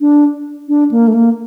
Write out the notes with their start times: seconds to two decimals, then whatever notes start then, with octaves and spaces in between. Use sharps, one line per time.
0.01 D4
0.68 D4
0.91 A#3
1.08 A3
1.14 A#3